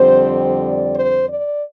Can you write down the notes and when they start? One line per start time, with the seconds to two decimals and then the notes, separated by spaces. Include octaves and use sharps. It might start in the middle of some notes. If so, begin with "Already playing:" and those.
Already playing: F2 D3 G3 C4 C5
0.62 D5
0.95 C5
1.28 D5